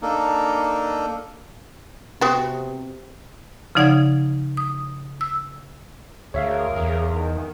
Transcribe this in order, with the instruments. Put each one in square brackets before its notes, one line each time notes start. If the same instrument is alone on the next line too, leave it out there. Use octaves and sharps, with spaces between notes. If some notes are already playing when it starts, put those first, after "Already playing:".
[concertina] A#3 D4 D#4 A4 A#4
[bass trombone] C3 [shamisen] B3 C4 F#4
[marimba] C#3 F3 D#4 D5 F#5 G#6
D#6
E6
[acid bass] D2 [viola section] G#4 A#4 [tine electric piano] C#5 E5 F5
[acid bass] E2
[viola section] D#3